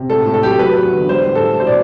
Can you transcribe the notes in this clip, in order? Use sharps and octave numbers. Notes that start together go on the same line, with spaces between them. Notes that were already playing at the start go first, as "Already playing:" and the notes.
Already playing: C3
A2 A4
A2
A4
F#3 G4
A4
F#3 B4
E2
D3
G3 C5
A2
A4
E3
B2 C5
D5